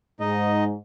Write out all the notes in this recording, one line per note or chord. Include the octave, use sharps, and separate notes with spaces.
G#2 D#4 D#5